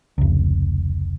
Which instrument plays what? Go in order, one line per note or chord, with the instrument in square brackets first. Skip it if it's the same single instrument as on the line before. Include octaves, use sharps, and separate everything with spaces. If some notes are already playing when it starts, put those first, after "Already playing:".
[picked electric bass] F1 C#2